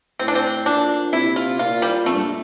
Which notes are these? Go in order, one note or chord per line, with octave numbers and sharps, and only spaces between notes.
A2 C4
D4
C4
A#2 D4
C3 E4
F4
A#2 F4
G3
F2 A3
G2